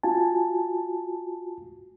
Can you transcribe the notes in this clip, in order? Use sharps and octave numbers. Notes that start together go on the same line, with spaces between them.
F4 F#4 G#5 A5